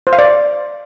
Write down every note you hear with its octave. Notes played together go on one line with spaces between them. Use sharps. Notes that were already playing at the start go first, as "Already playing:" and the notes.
C5
F5
D5
F5